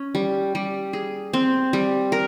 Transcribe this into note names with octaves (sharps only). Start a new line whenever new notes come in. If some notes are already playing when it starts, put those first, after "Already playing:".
Already playing: C#4
G3
G3
G#4
C4
G3
A#4